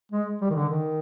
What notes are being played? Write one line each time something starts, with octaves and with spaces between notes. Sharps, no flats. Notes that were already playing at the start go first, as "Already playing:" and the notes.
G#3
G3
D#3
D3
D#3